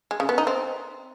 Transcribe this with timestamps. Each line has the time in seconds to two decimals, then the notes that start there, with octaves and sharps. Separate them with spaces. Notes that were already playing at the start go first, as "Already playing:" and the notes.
0.11 G#3
0.20 C#3
0.29 B3
0.38 D#4
0.47 C4